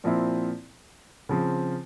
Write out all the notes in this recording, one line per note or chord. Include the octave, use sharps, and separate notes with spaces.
A#2 F3 C4 E4
C#3 F3 C4